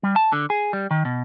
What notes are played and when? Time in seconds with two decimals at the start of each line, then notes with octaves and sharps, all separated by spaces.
0.03 G3
0.16 A5
0.33 D3
0.50 G#4
0.73 G3
0.91 D#3
1.05 B2